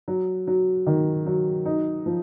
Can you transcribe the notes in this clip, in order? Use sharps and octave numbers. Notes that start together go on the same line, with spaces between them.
F#3
F#3
D#3
F#3
D#4
F3